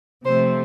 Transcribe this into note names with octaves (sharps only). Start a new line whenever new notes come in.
C3 F3 A3 C4 C5